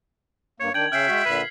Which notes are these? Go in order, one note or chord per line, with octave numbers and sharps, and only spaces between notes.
G2 A#3 C#5
D#3 D4 G5 G#6 F#7
C#3 C#4 E5 G5 F6 C7
G#3 F#4 B6
A#2 D3 B4